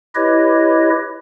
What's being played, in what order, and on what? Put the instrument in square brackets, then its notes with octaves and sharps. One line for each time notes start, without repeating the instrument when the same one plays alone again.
[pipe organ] E4 G4 B4 C#5 D#5